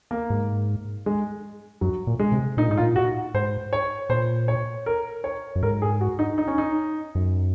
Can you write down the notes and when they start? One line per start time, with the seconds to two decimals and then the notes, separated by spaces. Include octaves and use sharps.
0.11 A#3
0.30 G#2
1.06 G#3
1.81 F#2 F#3
2.07 A#2
2.19 G#3
2.32 C3
2.57 A#2 D#4
2.68 G#2 D#4
2.77 F4
2.80 A#2
2.96 F#4
3.34 G#2 C5
3.73 C#5
4.09 A#2 C5
4.48 C#5
4.86 A#4
5.24 C#5
5.56 F#2
5.63 G#2 A#4
5.82 G#4
6.01 F#4
6.19 D#4
6.38 D#4
6.48 C#4
6.58 D#4
7.15 F#2